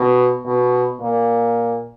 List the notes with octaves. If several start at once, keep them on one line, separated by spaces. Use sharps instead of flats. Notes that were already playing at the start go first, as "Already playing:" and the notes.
Already playing: B2
B2
A#2